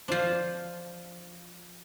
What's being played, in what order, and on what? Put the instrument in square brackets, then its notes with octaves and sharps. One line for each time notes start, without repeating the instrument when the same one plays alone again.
[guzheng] F3 D4 [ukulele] F4 C5